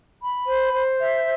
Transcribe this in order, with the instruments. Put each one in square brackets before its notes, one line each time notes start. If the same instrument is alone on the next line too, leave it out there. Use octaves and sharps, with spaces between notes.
[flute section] B5
C5
C5
E5